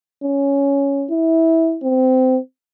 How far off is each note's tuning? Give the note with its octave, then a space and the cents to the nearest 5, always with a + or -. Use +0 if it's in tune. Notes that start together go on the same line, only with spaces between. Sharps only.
C#4 +5
E4 -15
C4 -20